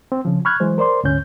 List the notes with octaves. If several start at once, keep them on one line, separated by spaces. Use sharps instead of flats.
C4
C#3 F3
B5 C#6 F6 F#6 G#6
E3 F#3 G#3 C5
A#4 C5 D5 C6
D2 G#2 D3 C#4 G6